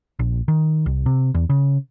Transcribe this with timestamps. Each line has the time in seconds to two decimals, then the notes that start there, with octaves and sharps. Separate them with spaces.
0.19 A#1
0.48 D#3
0.86 C2
1.06 C3
1.34 E2
1.49 C#3